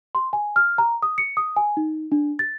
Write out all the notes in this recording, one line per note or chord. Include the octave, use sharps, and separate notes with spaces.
C6
G#5
F6
A#5
D#6
C#7
D#6
G#5
D#4
D4
A6